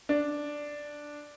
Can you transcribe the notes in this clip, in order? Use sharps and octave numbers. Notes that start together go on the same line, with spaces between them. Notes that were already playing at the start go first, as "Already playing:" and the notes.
D4